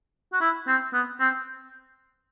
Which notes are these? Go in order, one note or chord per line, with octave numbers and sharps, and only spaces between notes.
F#4
E4
C4
B3
C4